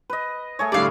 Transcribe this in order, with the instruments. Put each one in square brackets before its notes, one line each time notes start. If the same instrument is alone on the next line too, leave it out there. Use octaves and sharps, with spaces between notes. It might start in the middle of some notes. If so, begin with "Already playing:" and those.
[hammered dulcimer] B4 D#5
A3 G#4 C#5
[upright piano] A2 D3 G3 [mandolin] D5 F5